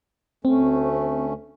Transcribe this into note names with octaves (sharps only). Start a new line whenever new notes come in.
D2 A3 C4 C#4